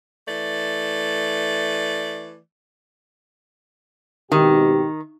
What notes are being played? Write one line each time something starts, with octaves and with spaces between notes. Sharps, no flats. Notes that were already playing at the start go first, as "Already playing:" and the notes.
E3 A3 D5
G#1 B2 D#3 D#4 G4